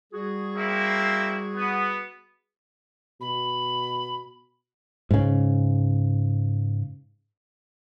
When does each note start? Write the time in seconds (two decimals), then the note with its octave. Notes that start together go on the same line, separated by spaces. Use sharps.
0.12 G3 F#4 G#4
0.56 A#3 C4 E4
1.55 B3
3.21 B2 B5
5.11 G#2 C#3